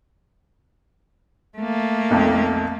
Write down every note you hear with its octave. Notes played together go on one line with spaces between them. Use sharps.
A3 A#3
B1 F2